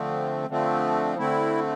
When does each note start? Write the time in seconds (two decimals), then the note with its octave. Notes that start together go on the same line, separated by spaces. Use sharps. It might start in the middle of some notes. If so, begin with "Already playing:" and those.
Already playing: D3 F3 A3 C4
0.48 D3 F3 A3 C4
1.18 D3 A3 C4 E4